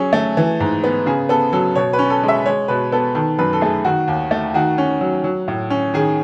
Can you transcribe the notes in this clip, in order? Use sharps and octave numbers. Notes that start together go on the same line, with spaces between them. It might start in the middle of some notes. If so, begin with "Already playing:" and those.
Already playing: F#3 C#4 G#4
A3
E3
G#2
B3
C#3 G#4
B3 A4
F#3 A4
B2 C#5
B4
C#4
A4
G#3
E5
G#3 C#5
B2 B4
B3 A4
D#3 A4
F#2 B4
A4
A3 G#4
D#3 F#4
D#2
A3
D#3 F#4
C#4
F#3
F#3
A2
C#4
D#3 G#4